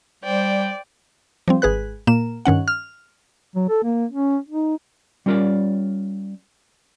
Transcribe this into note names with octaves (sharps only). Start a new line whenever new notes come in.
G3 C5 D5 G5
F3 G3 C4
G#1 G#4 B4 F#6
A#2 A#3 E7
G2 D#3 C#4 F#5
F6
F#3
A4
A#3
C#4
D#4
G3 C#4 F4 A#4 C#5 D5